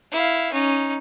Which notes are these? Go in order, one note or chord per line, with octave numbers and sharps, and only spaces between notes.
E4 F5
C#4 D#4